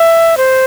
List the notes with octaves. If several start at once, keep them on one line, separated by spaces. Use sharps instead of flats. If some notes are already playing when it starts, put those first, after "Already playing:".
Already playing: E5
C5